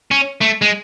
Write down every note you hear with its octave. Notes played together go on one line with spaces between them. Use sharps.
C#4
A3
G#3